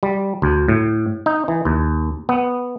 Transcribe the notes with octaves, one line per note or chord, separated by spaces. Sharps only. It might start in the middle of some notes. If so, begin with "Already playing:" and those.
G3
D2
A2
D#4
E3
D#2
B3